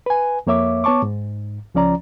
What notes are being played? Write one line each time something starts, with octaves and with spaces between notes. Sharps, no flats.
B4 G#5
F2 A#3 C#5 E5 D6
B3 C#5 A5 C#6 D6
G#2
C#2 F3 C#4 D5 A#5